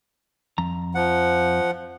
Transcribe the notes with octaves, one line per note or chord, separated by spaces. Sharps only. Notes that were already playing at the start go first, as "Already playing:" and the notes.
F2 A#5
F3 F#5